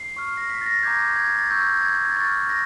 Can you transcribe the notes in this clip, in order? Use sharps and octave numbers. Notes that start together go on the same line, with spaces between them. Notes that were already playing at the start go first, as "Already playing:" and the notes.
Already playing: C7
C#6 F6
A#6
B6
A6
A#6
A#5 D6 G6 G#6
G#6
A6
A6
C#6 E6 G6
A6
G#6
G#6
A6
C#6 F6 A6
A#6